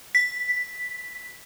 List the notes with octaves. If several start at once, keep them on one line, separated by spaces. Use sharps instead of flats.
B6